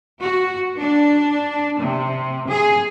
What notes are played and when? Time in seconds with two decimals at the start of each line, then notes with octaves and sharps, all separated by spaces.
0.21 F#4
0.78 D4
1.80 C3
2.50 G#4